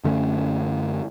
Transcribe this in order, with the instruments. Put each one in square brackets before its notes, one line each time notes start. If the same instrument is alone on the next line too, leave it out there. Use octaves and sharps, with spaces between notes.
[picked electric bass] F#2 D3 A3 C#4